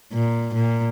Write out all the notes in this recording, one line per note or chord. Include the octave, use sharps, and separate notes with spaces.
A#2
A#2